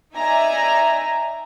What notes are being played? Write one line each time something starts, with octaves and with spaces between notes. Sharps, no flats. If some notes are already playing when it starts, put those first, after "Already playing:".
D#4 D5 E5 G#5 A#5